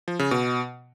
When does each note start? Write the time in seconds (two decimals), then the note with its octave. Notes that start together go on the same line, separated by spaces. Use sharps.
0.08 F3
0.19 C#3
0.31 B2